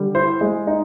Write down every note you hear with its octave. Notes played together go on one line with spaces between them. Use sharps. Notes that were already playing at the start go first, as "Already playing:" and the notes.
Already playing: D3 G3
E4 C5
G#3
D#4